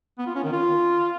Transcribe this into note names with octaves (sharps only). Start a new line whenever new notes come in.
B3
F4
C#4
D#3
F4